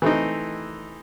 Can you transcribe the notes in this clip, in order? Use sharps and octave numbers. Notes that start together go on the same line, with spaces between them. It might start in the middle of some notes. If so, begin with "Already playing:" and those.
E3 A3 C4 D#4